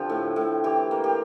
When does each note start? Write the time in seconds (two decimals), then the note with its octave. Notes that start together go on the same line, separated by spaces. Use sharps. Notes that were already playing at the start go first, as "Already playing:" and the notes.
Already playing: D3 F3 C4 G4
0.09 A2
0.36 A2
0.64 E3 G4
0.91 A#3
1.04 G4